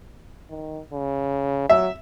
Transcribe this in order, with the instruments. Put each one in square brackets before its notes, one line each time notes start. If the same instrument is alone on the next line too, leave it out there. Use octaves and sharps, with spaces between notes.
[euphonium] D#3
C#3
[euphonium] F#3 [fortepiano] E5